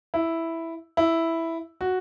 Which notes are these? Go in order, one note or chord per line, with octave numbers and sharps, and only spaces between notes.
E4
E4
F#4